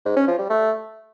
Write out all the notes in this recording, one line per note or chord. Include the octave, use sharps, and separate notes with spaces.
G#2
C#4
F3
G3
A3